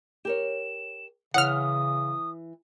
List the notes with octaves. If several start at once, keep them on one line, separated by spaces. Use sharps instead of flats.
G4 A#4 C#5 E7
C#3 E3 C#5 F#5 D#6 F6